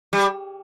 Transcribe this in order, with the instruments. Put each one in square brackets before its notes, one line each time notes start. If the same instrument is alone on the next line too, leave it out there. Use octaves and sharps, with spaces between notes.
[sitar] G3